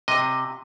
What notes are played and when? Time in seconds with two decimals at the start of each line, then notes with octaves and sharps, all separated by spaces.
0.08 C3 D#5